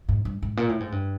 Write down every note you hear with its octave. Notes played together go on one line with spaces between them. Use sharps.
G#2
G2
G#2
A#2
A2
G#2
G2